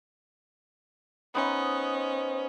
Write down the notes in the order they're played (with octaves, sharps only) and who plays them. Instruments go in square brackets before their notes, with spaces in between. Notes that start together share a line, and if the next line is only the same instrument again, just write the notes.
[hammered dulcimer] B3 D#4 C5 [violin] C#4